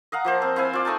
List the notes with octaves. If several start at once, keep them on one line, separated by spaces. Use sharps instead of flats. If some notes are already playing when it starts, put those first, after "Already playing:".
D#5 F5 F#5 A#5
F3 A#3 C5
C4
C4 E4 F5 G#5
F4 D5
A3 D#4 G#5 A5